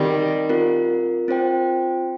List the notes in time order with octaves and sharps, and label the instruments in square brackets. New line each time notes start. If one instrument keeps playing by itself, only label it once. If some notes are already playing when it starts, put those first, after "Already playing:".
Already playing: [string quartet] D#3 G3 [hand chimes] C4 D#4 G4
[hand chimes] C4 F4 A#4
C4 F4 C5 G5